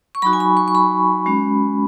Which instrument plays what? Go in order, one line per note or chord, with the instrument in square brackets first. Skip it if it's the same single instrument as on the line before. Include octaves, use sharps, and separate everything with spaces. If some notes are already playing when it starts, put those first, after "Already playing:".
[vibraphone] C#6
F#3 D#4 F#4 B5
G#5
B5
C#6
C#6
B5
G#3 C#4 F#4